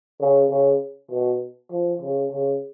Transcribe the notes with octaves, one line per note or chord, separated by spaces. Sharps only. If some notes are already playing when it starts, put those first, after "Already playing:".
C#3
C#3
B2
F3
C#3
C#3